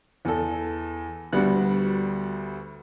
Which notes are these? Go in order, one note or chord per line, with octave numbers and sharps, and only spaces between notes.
E2 A4
D2 G3 B3 F#4 F#6